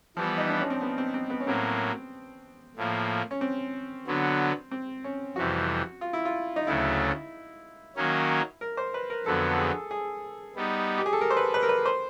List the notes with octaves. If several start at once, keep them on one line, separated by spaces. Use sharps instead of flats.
E3 F3 G3 B3
D#4
D4
C#4
C4
B3
C4
C4
B3
C#4
A2 F#3 A#3 C4
A2 F3 A#3
C#4
C4
D3 F#3 B3
C4
C#4
F2 C3 E3 G3 F#4
F4
E4
F4
D#4
D2 C#3 F#3 A3 E4
D#3 F#3 A#3 C#4
A#4
C5
B4
A#4
F2 D3 F#3 B3 A4
G#4
G#4
G3 B3 D#4
G4
G#4
A4
A#4
C5
B4
B4
A#4
B4
C5